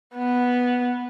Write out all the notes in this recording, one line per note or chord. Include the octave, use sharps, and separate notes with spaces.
B3